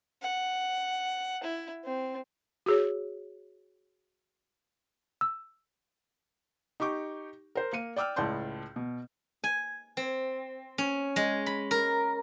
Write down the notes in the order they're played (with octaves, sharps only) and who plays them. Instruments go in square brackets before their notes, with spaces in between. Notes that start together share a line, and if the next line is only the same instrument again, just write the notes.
[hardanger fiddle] F#5
E4
C4
[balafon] F#4 G#4 C#5
[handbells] E6
[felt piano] D#4 G4 C#6 D6
A#4 C5
A#3 C#7 D#7
D5 G5 D6 E6 F6
C#2 A2 D5 A5 C6 G6
B2
[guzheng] G#5
C4
C#4
G#3
B5
A#4